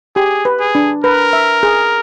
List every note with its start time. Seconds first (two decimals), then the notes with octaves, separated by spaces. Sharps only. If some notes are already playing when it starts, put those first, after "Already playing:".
0.16 G4 G#4
0.45 B4
0.60 G#4
0.75 D4
1.04 A#4 B4
1.33 E5
1.63 G#4